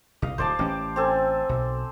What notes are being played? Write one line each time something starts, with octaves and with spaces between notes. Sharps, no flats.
C2 D#5 F5
D1 C5 D5 A5
A1 C#4 G4
C4 A4 G#5
B1